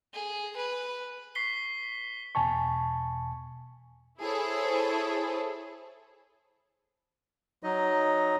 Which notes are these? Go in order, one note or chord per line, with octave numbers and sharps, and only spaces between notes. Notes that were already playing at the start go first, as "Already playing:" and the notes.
G#4
B4
C#6 B6 C7 G7
E2 B2 G#5 A5 C#6
E4 G#4 A4 C5 C#5
F#3 D#4 D#5